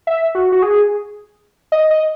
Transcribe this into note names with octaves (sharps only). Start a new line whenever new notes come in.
E5
F#4
F#4
G#4
D#5
D#5